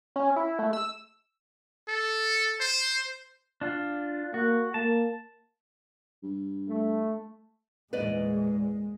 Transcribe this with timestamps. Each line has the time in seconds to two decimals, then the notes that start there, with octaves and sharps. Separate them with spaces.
0.16 C#4
0.36 E4
0.59 A3
0.73 E6
1.88 A4
2.60 C5
3.61 D4 F4
4.34 A#3 F#4
4.74 A#3 A5
6.23 G2
6.69 A3
7.93 A#1 E2 G#2 G#3 B4 D5 D#5